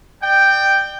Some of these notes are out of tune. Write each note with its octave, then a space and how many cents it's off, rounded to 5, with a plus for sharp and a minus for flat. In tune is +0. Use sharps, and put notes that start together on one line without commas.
D5 +35 G5 +0